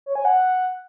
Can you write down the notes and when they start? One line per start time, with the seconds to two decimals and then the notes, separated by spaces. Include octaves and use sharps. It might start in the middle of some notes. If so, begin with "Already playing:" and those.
0.06 C#5
0.15 G#5
0.25 F#5